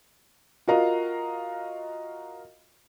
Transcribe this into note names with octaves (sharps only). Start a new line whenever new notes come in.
F4 F#4 A#4 D#5 F5 A#5